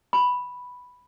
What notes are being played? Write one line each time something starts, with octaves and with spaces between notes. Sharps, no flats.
B5